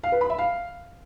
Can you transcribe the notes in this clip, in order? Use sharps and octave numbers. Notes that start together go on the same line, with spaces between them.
F5
B4
B5
E5
F5